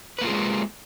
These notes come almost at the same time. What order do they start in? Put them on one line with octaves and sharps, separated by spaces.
B4 A#3 F4 G#4 G#3